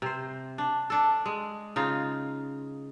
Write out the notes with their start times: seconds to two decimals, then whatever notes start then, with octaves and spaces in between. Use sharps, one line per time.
0.02 C3 C5
0.58 D4
0.90 D4 A4
1.26 G#3
1.76 C#3 D#4 F4